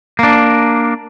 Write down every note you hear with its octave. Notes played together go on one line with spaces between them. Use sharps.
A#3 D4